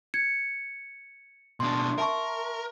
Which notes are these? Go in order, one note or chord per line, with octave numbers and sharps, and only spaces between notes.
G#6 C#7
B2 D4 C6
A#4 E5 A5 C#6